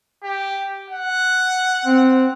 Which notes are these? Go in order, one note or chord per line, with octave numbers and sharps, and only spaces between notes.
G4
F#5
C4